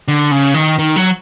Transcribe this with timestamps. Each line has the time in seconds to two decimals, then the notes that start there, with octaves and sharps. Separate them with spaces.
0.08 D3
0.31 C#3
0.54 D#3
0.79 D#3
0.96 F#3